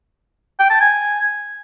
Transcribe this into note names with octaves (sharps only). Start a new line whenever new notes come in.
G5
A5
G#5